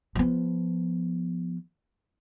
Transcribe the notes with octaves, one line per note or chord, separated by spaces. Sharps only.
F3 B3